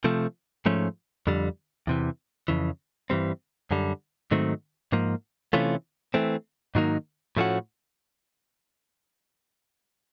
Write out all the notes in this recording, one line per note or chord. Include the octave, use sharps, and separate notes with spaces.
C3 F3 A3
G#2 F3 A3 C#4
F2 D3 G3
E2 C3 E3
F2 C#3 E3
G2 E3 G3 C4
F#2 D3 G3
G#2 D#3 F#3 A3 C4
G#2 F3 A#3
C3 E3 A3 C#4 F4
E3 A3 C4
G#2 D#3 F#3 A#3 D#4
A2 F3 A3 C#4 F#4